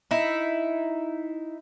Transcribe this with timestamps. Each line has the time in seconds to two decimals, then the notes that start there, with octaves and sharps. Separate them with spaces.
0.11 D#4 E4